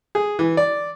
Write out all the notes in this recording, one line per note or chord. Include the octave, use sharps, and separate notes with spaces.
G#4
E3
D5